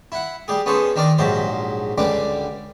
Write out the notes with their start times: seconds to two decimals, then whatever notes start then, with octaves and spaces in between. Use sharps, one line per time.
0.12 E4 F#5
0.48 G3 G4 G#4
0.66 B3 C#4 G#4 A4 C5
0.96 D#3 D4 A#4 D5
1.18 A#1 G#2 F#3 G4 C5
1.98 C#2 D3 G3 D4 D6